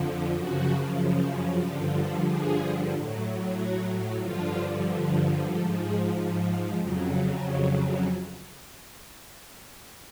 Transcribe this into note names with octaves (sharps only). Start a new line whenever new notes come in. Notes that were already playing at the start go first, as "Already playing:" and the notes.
Already playing: F2 D3 F3
F#2 C#3 F3 F#4
G2 D3 F3 G4
A4
G#4
A2 F#3
F#4
G2 D3 F3 F4
G#2 F3 A4
G#4
F2 C#3 F#3